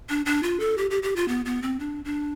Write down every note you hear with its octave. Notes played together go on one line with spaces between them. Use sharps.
D4
D4
F4
A4
G4
G4
G4
F4
B3
B3
C4
D4
D4